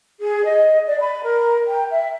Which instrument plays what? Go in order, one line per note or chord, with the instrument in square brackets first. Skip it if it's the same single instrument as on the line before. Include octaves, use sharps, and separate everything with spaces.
[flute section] G#4
D#5
D5
B5
A#4
G5
E5